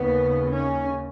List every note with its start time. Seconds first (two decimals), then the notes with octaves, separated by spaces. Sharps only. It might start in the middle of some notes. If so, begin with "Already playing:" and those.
Already playing: D#2 C#3 B3
0.52 C#4